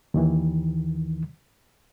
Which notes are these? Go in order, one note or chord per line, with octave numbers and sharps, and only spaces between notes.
D#2 D#3 E3